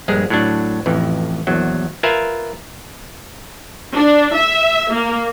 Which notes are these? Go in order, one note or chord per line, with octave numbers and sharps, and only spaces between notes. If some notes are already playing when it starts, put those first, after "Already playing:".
A#1 G2 G#3 G#4
A2 F#3 D4
A1 F2 E3
A#1 E2 F#3
F4 A#4 B4 E5 G#5
D4
E5
A#3